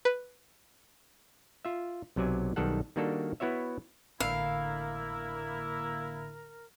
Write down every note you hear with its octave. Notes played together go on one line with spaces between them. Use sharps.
B4
F4 E5
B1 C3 F#3 D5 G#5
B1 D#3 G3 A4 F#5
D#3 G3 A#3 D4 F#4 A4
B3 E4 F#4 C#5 E5
G#1 A2 D3 A#3 E4 A#4 F5